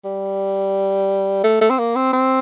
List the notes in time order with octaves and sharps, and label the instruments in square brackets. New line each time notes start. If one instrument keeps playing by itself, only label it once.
[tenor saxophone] G3
A3
A3
C4
A#3
C4
C4